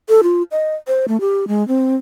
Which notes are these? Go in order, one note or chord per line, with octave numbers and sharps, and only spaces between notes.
A4
F4
D#5
C5
A3
G4
G#3
C4